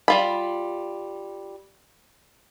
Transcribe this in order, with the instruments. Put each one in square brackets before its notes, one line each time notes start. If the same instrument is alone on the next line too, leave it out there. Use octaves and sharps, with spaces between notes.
[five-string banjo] G3 F4 B5